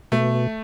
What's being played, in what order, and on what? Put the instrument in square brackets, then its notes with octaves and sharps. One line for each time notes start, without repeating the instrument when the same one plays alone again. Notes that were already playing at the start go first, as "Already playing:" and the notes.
[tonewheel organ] B2 [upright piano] A3